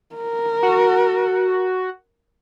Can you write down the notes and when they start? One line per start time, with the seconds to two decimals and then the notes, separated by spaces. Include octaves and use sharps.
0.16 A#4
0.63 F#4